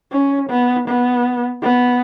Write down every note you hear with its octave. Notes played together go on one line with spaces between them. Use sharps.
C#4
B3
B3
B3